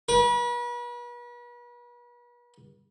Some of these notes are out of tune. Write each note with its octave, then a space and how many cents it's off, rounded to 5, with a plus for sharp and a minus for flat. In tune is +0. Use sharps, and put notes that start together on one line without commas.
B4 -40